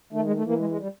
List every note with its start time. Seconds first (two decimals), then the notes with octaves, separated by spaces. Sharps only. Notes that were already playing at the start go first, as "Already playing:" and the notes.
0.13 D#3 A3
0.24 G#3
0.35 A3
0.46 E3 A#3
0.58 G#3
0.69 G#3
0.80 G3